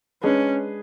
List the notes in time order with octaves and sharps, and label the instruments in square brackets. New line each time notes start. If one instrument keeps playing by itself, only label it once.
[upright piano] G#3 D4 G#4 B4 [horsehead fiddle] C#4